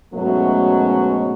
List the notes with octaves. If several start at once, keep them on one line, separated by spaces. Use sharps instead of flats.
G#2 B2 F#3 A3 C#4 D#4